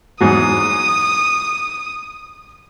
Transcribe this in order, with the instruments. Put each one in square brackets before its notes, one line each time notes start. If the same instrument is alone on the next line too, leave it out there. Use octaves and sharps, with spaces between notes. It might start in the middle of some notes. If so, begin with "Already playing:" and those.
[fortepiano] E2 G#2 F#3 [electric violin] D#6